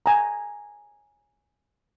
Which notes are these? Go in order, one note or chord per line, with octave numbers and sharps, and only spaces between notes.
G#5 A#5